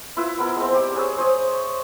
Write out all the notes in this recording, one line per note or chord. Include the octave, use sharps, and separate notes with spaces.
E4 F4 B4 E6
B3 E4 A#4 B5
G#3 C4
G3 G4 D6
G#4 B4 C#5 E6
C5 C#5 D#6